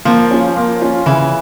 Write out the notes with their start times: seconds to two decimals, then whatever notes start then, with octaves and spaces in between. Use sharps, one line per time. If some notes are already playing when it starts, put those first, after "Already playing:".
0.05 F3 A#3
0.31 C#4 F4
0.56 A#3
0.82 C#4 F4
1.06 C#3 E3